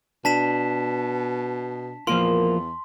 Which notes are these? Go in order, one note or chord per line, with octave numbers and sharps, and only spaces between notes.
B2 D4 A5 B6 E7
E2 F3 A#3 F4 A#4 C6